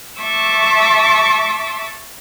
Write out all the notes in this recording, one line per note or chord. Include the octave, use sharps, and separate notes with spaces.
E5 A5 C#6 D6 E6